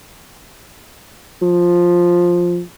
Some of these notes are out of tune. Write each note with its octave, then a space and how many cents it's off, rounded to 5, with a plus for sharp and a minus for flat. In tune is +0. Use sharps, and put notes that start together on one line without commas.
F3 +5